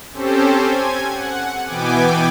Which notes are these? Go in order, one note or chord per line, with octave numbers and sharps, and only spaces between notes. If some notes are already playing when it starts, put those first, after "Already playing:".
C4 C#4 G4 A4 C5
G#5 G#6
F#5
B2 E3 B3 G5 G#5 D6